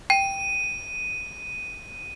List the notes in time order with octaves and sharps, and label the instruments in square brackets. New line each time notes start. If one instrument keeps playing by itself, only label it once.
[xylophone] G5 [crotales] D#7